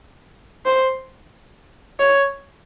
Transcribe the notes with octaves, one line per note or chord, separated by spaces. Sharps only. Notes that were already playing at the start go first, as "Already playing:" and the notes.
C5
C#5